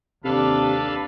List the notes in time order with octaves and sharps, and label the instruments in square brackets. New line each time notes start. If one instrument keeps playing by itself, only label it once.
[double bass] D#2 D4 [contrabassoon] C3 [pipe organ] A4 B4 F5